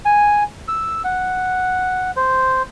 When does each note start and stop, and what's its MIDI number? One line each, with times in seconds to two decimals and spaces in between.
0.05 0.43 80
0.68 1.02 88
1.04 2.11 78
2.16 2.63 72